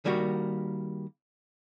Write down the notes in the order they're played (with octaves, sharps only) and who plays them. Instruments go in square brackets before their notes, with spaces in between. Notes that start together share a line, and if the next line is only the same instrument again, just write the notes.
[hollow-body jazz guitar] D#3 G3 A#3 F#4